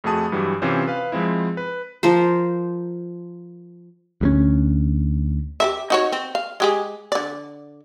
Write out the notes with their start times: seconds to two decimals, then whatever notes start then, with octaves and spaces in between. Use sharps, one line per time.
0.04 F2 A3 F#4 G#4 A5 D#6
0.32 G2 E3 F#3 G3
0.62 C3 E3 C4 C#4 F4 C5
0.87 B4 F5
1.12 F3 G#3 C4 E4
1.57 B4
2.03 F3 A#4 C5
4.21 D2 G3 C#4
5.60 G4 A#4 E5
5.90 D#4 F#4 C#5
6.12 C4
6.35 F5
6.60 G#3 G4 G#4
7.12 D3 D5